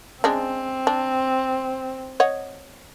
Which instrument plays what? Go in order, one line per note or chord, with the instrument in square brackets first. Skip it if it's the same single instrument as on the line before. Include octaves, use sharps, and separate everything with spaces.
[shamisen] C#3 G#3 D4 [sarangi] C4
[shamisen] D4
C#5 D#5 F#5